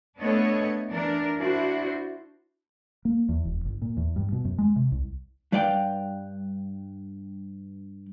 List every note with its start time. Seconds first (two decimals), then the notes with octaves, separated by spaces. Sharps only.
0.18 A3 B3 D4 A4 C#5 D#5
0.90 E3 D4 A#4
1.39 D4 E4 F#4 C5
3.05 A#3
3.29 E2
3.45 E1
3.65 G1
3.82 A#2
3.97 E2
4.16 G2
4.32 B2
4.45 F#2
4.58 G#3
4.76 C3
4.92 C2
5.52 G2 G3 B4 D5 F5 G5